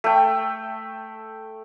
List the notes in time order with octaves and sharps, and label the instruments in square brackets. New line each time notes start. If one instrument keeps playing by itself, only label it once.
[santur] A3 G5